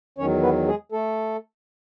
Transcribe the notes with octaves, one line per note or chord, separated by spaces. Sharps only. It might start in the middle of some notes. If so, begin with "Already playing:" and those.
E2 D#3 F#3 C#4 C#5
B3 B4
G#3 G#4
A3 A4